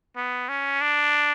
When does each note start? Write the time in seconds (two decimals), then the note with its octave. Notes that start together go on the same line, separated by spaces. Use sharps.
0.16 B3
0.49 C#4
0.81 D4